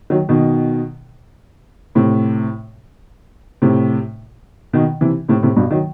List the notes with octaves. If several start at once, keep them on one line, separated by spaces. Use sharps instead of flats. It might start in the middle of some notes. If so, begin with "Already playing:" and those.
D#3 F#3
B2 D#3
A2 C3
A2 C3
B2 D#3
C3 E3
A2 C3
A2 C3
G2 B2
D#3 F#3